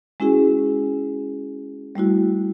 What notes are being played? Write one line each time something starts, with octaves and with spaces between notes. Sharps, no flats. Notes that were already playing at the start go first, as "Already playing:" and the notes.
G#3 C#4 E4 F#4 G#4
G3 A3 E4 F#4